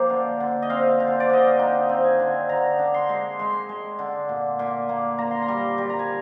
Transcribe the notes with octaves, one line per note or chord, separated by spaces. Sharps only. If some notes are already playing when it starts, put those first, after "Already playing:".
Already playing: F3 A#3 F5 G5
D3
D3
D#5
C4 F5
D3
C5
D5
D3 D#5
F5
D#4 G5
C4
G#5
D3
D3 A#5
D4
C6
G#3
G#3 C6
G#3
D3
A#2
A#2
A#3
A#3 A#5
C6
A#5
G3
G3
A#5
G#5